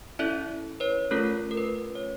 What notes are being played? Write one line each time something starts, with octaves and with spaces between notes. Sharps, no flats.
C#4 E4 A4 D5 E5
B4 C#5
A3 C#4 F4 A4 A#4
A#4
B4
C#5